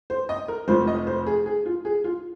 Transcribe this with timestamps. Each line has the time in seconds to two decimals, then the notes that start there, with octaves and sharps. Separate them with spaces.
0.10 C5
0.29 D#5
0.48 A#4
0.68 F1 F2 F3 C5
0.87 D#5
1.07 C5
1.26 G#4
1.46 G#4
1.66 F4
1.85 G#4
2.04 F4